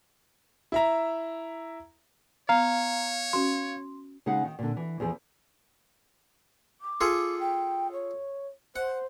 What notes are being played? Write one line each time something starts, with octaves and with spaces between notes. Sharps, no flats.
E4 E5 A#5
B3 C#5 F5 A#5
C#4 F#4 C6
C#3 G#3 D#4 G#4 F5 F#5
D#3
A#2 D3
E3
E2 F3 G#4
D6
F4 G#4 A4
G5
C#5
C5 F#5